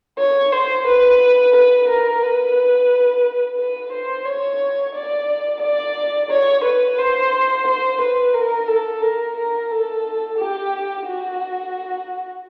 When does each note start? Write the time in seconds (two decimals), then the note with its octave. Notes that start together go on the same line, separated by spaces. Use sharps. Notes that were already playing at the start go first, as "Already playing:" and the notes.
0.19 C#5
0.52 C5
0.87 B4
1.54 B4
1.88 A#4
2.22 B4
3.58 B4
3.92 C5
4.26 C#5
4.95 D5
5.62 D5
6.30 C#5
6.64 B4
6.98 C5
7.66 C5
8.01 B4
8.34 A#4
8.68 A4
9.02 A#4
9.37 A#4
9.71 A4
10.39 G4
11.07 F#4